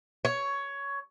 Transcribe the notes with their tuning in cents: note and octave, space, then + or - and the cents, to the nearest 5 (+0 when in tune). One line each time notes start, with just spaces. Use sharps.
C#5 +10